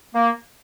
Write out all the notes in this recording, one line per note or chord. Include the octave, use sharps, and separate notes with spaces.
A#3